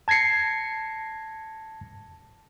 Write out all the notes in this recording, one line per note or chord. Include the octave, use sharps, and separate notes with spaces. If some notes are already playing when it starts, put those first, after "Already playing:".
A5 G#6 A#6 C7 C#7